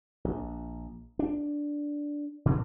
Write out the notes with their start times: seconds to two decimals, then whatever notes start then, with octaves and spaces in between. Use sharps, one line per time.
0.25 A#1
1.19 D4
2.45 A#2 D3